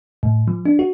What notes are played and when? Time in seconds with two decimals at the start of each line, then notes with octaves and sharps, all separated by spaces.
0.23 A2
0.48 F3
0.66 D4
0.79 F#4